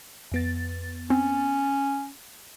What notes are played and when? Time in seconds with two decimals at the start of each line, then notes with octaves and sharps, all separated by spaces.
0.32 F2 B3 A6
1.10 C4 C#4